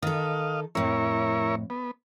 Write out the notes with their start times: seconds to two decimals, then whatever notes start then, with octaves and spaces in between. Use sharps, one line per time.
0.03 D#3 A4 D#5 F5
0.75 F2 A2 E4 A#4 C#5
1.70 B3